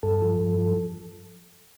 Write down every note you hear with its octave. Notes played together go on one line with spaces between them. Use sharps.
G2 A4
F3
G2
F3